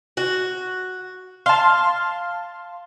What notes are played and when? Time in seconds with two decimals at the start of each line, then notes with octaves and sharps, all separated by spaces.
0.17 F#4
1.46 F5 A5 C6